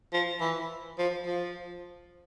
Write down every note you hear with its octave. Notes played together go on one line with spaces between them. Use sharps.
F3
E3
F3
F3